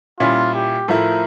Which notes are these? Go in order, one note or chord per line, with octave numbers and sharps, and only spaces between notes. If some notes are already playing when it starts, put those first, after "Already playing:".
A#2 G3 C#4 E4 F4
G4
A2 F3 A3 E4 A#4